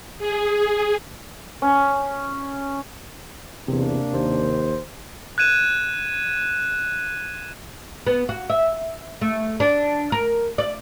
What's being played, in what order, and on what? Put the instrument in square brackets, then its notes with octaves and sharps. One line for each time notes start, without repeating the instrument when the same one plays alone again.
[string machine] G#4
[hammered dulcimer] C#4
[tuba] E2 [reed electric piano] C3 [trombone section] A#3 D4
[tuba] D#2 [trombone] C5
[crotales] F#6 G#6 D#7 E7
[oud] B3
F#4
E5
A3
D4
A#4
D5